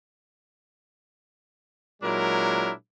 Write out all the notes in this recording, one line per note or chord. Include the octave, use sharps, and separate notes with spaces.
A#2 F#3 G#3 D4 E4 A#4